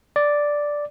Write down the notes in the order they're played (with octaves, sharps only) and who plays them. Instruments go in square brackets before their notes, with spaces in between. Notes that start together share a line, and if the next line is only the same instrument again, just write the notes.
[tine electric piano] D5